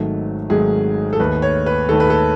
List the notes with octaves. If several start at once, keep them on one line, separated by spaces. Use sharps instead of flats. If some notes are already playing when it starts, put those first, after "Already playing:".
Already playing: G#1 G#2 D#3 F#3 A3
G#1 G#2 D#3 F#3 A3 G#4
A4
D#2 D#3 A3 B4
C#5
B4
D#2 D#3 A3 A4
B4
A4